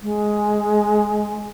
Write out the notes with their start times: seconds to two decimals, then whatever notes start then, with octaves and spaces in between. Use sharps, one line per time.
0.02 G#3